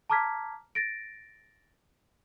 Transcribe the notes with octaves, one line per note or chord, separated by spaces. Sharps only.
A5 A#5 D6 F6 G#6 B6
A6 A#6 D7